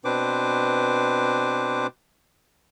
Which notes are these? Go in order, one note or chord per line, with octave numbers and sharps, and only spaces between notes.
B2 C4 D4 B4 C5 D6